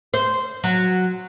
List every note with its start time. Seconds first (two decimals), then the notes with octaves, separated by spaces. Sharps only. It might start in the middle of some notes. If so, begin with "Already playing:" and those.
0.14 C5
0.64 F#3